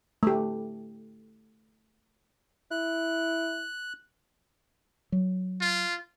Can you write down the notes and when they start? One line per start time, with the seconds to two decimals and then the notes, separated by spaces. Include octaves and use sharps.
0.23 A3 G4
2.71 E4 F#6
5.12 F#3
5.61 F4